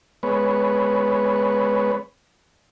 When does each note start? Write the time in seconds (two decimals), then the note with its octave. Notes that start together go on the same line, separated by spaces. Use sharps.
0.23 G#3 B3 B4 C#5